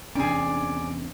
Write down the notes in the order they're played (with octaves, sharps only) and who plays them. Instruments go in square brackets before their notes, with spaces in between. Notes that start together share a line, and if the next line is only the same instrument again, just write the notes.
[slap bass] E2 C3 C#4 [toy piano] D4 [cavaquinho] G#4 D5